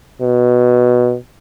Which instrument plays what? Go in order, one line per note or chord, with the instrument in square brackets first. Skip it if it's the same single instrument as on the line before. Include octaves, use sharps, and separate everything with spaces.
[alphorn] B2